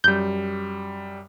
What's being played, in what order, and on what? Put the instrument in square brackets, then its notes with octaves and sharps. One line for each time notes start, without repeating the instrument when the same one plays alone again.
[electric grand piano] F#2 G3 [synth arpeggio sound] G6